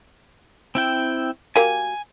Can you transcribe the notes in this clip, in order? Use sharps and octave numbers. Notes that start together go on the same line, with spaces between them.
C4 E4 G5
F#3 A#3 G4 G#5